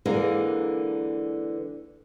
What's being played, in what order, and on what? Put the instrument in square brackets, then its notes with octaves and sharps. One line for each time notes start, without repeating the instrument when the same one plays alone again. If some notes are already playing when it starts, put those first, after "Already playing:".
[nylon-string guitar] D3 E3 G#3 A#3 A#4